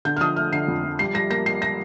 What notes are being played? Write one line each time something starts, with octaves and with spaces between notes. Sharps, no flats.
D3 G6
F6
F3 D#6
A3 F6
D3 C7
F2
F3
G3 C7
G3 A#6
A#3 A#6
G3 C7
A#6